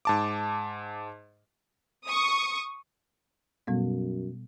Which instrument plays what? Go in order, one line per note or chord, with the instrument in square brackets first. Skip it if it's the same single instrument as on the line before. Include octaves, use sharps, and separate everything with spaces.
[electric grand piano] G#2 A5 D6
[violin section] C#6 D#6
[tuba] F#2 [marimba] B2 G3 B3